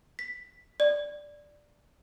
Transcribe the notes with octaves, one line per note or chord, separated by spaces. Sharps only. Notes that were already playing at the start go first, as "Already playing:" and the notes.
B6
D5